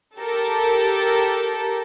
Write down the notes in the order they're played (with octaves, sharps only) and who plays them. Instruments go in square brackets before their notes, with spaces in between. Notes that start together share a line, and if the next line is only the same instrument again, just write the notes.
[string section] G4 A4 A#4